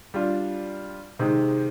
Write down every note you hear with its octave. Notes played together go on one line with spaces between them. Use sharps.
G3 D4 F4
C3 D#3 G#3 D#4